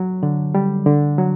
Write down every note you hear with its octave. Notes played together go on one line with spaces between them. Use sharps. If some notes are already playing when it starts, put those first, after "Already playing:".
Already playing: F#3
D3
G3
D3
F#3